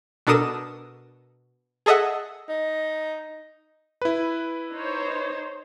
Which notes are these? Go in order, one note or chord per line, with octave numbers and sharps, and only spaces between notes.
B2 D4 A4 A#4 D#6 E7
G#4 A4 D#5 E5 F#5
D#4
E4 B4
D#4 C5 C#5